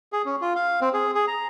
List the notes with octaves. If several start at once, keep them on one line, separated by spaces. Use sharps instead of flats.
G#4
C#4
F4
F5
C4
G#4
G#4
A#5